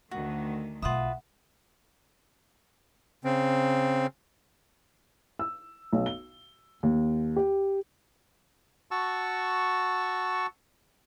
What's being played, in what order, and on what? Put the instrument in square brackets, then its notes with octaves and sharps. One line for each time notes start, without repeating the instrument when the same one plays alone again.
[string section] D2 D#3 [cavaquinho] F#4
[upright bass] B1 A3 [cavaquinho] F4 B4 D#6 [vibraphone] E5 F#5
[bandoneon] C#3 C4
[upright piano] E6
B1
G7
D#2
G4
[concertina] F#4 A5 C#6 E6